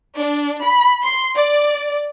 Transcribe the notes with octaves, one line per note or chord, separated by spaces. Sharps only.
D4
B5
C6
D5